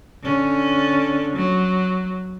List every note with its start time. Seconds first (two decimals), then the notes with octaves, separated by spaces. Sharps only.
0.23 D3 C#4
1.36 F#3